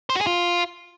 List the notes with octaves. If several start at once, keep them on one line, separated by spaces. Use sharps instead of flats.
C5
F#4
G#4
F4